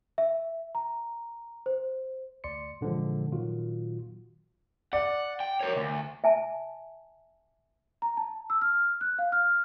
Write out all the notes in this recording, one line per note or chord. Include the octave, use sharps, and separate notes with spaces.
E5
A#5
C5
D2 D5 C6 C#7
A#2 D3 E3 F3 G#3
A#2 D#3 F#3 F4 F#4
D5 F#5
G5
A#4 C#5
D2
E5 G#5 A5
A#5
A5
E6
F6
F#6
F5
F6